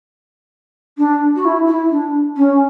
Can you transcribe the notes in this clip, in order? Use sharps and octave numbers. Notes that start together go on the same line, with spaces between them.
D4
F#4
E4
E4
D4
C#4